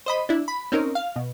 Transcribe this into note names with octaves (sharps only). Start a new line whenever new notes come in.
C5 D#5 B5
D4 E4
B5
C4 C#4 D#4 A#4
F5
B2